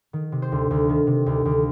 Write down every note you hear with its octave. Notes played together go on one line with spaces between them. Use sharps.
D#3
C3
C5
D2
D2
D#3
C3
D2
D2